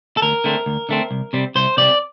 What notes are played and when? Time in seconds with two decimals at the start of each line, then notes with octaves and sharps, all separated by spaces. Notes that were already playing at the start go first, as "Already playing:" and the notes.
0.17 A4
0.22 D2 A#4
0.44 D3 A3 C4
0.66 D2
0.89 D3 A3 C4
1.11 C2
1.33 C3 G3 C4
1.55 C2 C5
1.77 C3 G3 C4 D5